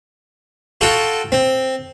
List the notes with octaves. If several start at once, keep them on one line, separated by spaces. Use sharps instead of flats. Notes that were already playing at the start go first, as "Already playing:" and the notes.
F4 F#4 A4 G5
C4